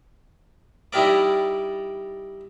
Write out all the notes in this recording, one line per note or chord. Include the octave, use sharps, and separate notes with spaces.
G3 D#4 E4 G4 A#4 D5